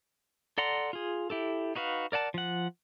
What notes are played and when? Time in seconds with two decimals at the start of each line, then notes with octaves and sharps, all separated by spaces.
0.58 A4 D5 F#5 A#5 C6
0.93 F4 G#4
1.30 E4 G4 A4
1.75 D#4 F#4 B4 F5
2.12 A#4 D5 F#5 A5
2.34 F3 F#5